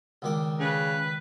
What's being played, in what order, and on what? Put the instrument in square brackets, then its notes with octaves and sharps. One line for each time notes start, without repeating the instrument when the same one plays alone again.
[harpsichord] C#2 D#3 D5
[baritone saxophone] C#3 [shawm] B4